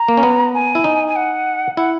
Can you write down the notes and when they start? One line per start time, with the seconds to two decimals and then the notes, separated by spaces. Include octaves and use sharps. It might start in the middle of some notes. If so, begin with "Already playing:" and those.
Already playing: A#5
0.08 A#3
0.17 C#4
0.23 B3
0.54 G#5
0.75 E4
0.84 D#4
1.07 G#5
1.16 F#5
1.77 E4 F#5